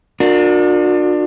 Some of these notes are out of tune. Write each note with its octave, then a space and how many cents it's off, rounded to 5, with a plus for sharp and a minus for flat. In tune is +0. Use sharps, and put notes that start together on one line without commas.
D4 +25 F#4 -45 A#4 -10